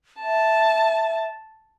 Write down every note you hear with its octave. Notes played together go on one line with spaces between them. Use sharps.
E5 A5